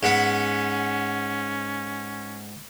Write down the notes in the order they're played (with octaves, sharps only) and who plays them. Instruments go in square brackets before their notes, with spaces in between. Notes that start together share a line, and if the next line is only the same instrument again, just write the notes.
[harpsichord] G#2 B3 [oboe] C#4